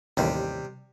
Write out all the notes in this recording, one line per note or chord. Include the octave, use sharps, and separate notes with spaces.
A1 D#2 C3 G3